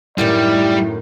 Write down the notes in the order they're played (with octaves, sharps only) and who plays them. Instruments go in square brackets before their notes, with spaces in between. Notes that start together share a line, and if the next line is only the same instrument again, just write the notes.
[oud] F#2 A2 D#3 [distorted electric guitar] G3 [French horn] E4 [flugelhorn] D5